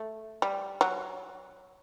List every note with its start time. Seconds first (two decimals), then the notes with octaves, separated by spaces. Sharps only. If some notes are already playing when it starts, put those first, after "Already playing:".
Already playing: A3
0.42 G3
0.81 F#3